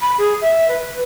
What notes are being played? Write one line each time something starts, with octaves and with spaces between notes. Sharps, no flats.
B5
G#4
E5
B4